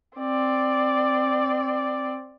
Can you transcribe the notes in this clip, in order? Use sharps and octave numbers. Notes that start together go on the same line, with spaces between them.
C4 D5